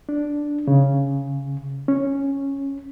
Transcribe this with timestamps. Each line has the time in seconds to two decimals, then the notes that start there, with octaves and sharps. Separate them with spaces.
0.09 D4
0.67 C#3
1.88 C#4